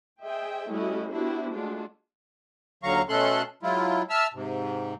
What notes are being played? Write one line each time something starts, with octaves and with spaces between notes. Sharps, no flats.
G#4 C5 D#5 E5 G5
G3 A3 C#4 E4 F#4 D#5
B3 D4 E4 F#4 G4 C5
G#3 A3 D4 F4 F#4
D#2 D3 F#3 F5 A#5 C#6
B2 A3 C#4 A4 C6 F#6
F#3 G#3 E4 F4
E5 A5 E6 F6
G#2 C3